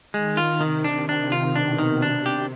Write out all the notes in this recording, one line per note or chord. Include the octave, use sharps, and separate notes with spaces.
D#3 G#3
F4
C3 D#3
D4
D4
F4
B2 D4
D#3
C3 D4
G4